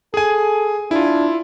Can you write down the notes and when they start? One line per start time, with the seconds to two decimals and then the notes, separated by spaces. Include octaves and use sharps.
0.14 G#4 A4 G#5
0.91 D4 E4 F4